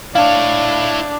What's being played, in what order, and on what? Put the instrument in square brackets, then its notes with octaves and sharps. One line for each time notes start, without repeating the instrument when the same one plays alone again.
[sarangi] D4 [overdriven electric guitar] E4 C#5 [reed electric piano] F5